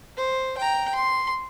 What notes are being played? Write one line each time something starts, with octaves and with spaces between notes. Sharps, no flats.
C5
G5 A#5
C6